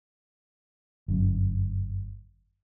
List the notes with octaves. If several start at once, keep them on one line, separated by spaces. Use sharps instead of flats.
G1 F#2